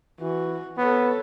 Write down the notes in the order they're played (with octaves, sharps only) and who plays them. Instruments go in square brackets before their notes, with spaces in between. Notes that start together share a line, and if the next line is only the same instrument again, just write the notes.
[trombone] E3 [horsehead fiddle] F#4
[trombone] B3 [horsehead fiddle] A4 C#5